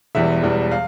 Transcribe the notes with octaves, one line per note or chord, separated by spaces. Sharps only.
E1 E2 E3 G3 E5
E1 E2 E3 G3
F5